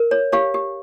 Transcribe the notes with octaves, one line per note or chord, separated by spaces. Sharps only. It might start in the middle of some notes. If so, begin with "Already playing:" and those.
Already playing: A#4
C#5
G4 C#5 F5
G4